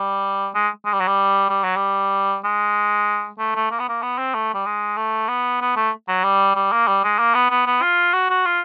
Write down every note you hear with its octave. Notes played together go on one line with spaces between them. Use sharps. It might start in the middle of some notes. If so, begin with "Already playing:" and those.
Already playing: G3
G#3
G#3
G3
F#3
G3
G3
F#3
G3
G#3
A3
A3
A#3
B3
A#3
B3
C4
A3
G3
G#3
A3
B3
B3
A3
F#3
G3
G3
A#3
G3
G#3
A#3
B3
B3
B3
F4
F#4
F#4
F4